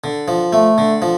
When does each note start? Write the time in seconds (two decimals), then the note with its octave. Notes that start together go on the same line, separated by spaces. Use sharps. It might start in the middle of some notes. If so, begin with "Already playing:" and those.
0.04 D3
0.28 F3
0.53 A3
0.78 D3
1.02 F3